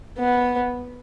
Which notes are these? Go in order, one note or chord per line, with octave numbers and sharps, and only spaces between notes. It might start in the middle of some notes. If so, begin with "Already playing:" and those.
B3